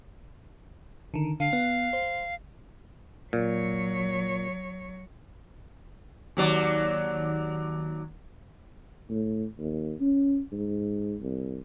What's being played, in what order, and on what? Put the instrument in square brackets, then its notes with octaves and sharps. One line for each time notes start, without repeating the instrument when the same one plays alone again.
[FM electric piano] D3 D#3
[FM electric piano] D3 [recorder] F5
[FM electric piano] B3
C5
[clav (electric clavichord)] A#2 [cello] F#3 C#5
[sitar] D#2 F#3 D5
[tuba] A2
D#2
C#4
G#2
C2